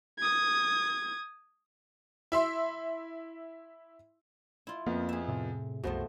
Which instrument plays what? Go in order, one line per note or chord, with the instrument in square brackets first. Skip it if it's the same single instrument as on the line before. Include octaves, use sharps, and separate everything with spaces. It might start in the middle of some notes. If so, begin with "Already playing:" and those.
[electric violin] D#6 G#6
[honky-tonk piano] E4 E5 C6
[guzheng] E4 F4
[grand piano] F2 F3 B3 [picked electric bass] A#3
[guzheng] G#4 E5
[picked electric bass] A2 C3
[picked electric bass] C2 F#2 [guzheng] B2 F3 A3 [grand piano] F#4 C5